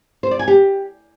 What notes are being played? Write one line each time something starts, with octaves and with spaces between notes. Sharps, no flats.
C5
D5
G#5
G4